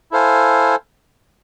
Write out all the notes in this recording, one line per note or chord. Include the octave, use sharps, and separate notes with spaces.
E4 A4 C5 F5 G#5